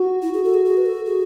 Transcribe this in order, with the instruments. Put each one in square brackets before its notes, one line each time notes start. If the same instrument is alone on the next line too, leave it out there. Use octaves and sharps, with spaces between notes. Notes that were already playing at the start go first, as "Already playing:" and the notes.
Already playing: [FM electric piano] F#4
[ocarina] E4
G#4
A4
G#4
G#4
B4
A4
G#4